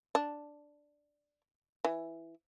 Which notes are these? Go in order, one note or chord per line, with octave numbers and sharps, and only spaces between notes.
D4
E3